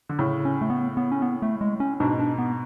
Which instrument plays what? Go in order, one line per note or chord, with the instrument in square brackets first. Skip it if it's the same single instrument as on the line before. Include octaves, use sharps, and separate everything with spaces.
[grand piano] D3
A2 C#3
[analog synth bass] C#4
A3
B3
B3
C#4
B3
A3
G#3
C#4
[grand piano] G#2 B2 [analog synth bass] D4
[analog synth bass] D4
B3